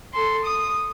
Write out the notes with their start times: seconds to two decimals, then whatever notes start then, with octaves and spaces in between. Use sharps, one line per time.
0.13 A4 C6
0.45 D#6